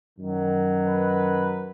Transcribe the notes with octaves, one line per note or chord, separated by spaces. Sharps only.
F#2 D#3 F#3
B4